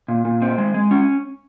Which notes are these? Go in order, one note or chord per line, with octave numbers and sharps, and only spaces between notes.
A#2
A#2
C4
G#3
G#3
C#4